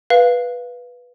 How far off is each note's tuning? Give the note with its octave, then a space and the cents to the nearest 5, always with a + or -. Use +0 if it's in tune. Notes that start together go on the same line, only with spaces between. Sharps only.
B4 -5 F5 +0